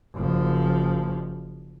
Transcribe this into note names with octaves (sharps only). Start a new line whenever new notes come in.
F#1 F3